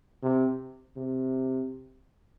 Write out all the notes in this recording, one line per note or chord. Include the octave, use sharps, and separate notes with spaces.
C3
C3